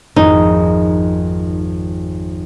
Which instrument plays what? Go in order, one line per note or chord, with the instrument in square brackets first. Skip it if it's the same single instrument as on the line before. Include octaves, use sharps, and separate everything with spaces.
[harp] G#1 F2 [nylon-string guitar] D#4